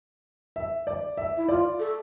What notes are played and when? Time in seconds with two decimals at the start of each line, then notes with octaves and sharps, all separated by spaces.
0.56 E5
0.87 D5
1.17 E5
1.37 E4
1.48 F4 D5
1.79 A4